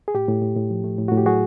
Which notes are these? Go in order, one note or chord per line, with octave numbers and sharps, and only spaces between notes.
G#4
A2 G4
A2
A2
A2
F3
A3
A2
A2 F#4
G4
F#3 F#4 G#4